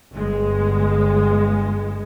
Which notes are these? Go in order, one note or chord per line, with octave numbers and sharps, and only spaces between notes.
G1 G#3